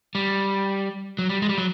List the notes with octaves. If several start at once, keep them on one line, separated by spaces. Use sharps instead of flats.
G3
F#3
G3
G#3
G3
F#3